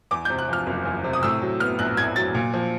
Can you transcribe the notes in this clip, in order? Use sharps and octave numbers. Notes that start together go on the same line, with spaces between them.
E2 D6
C3 G6
F#6
F3 F6
F#1
E2
C3
D#6
A2 E6
F#3
B3 F6
A#1 F#6
A2 G#6
F#3 A6
A#2
F3